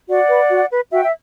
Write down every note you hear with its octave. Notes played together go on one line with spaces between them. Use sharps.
F#4 D5 F#5
B4
F#4
B4
F#4 E5 G5
E5